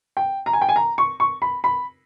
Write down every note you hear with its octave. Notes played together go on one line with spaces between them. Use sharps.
G5
A#5
G#5
G5
G#5
A#5
C#6
C#6
B5
B5